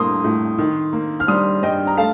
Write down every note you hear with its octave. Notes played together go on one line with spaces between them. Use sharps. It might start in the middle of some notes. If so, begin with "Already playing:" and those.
Already playing: A2 G3 A#3 C6 D#6
A2
D#3
A#3
F6
G3 C6 D#6
G2 D#5 G5
A#5
A3 F5 A5